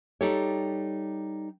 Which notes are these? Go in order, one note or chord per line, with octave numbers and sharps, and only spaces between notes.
G3 D#4 G4 A4 C#5